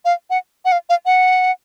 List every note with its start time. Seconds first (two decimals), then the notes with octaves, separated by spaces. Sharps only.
0.05 F5
0.30 F#5
0.65 F#5
0.72 F5
0.89 F5
1.06 F#5